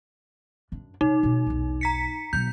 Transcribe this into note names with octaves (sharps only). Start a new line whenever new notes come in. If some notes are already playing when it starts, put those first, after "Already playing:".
F#2 D4
C3 D#4
B2 C4
B1 E2
A#5 B6 C#7
B2 F#3 G6